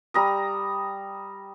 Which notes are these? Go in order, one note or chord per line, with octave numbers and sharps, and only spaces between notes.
G3 A#5 D#6